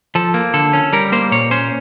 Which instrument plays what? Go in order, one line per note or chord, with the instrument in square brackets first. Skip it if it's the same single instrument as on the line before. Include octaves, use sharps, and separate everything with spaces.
[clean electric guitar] F3 A4
A#3
D3 A4
C#4
G3 A#4
A#3 C5
A#2 C#5
C#4 C5